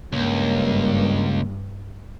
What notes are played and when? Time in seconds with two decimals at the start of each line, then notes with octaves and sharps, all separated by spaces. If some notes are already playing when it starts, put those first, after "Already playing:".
0.13 C#2 G2 A#3